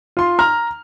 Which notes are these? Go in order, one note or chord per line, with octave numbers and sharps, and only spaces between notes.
F4 C6
A#5 F6